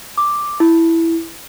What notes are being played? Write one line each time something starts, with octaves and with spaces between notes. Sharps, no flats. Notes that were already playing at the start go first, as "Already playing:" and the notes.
D6
E4